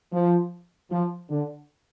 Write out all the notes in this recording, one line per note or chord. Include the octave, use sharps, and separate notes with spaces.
F3
F3
D3